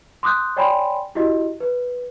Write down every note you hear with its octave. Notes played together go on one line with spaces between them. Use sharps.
C6 D6 D#6 F#6 G6
C#5 D5 G5 G#5 B5 C6
E4 F#4 G4 D#5
B4